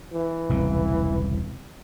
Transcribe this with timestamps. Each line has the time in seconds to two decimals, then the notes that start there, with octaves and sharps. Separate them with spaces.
0.13 E3
0.49 E1 C2 C#3